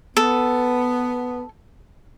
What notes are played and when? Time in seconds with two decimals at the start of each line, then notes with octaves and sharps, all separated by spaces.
0.17 B3 A4